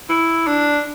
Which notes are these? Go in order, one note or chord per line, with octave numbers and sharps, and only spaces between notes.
E4
D4